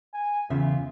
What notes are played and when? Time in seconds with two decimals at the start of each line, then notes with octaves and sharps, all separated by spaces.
0.14 G#5
0.50 E2 C#3 F4 E5